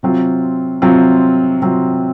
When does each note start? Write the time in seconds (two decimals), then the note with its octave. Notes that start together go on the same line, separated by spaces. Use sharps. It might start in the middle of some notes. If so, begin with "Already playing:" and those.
0.03 C3 F#3 C4 F4
0.82 C3 F#3 C4 F4
1.62 C3 F#3 C4 F4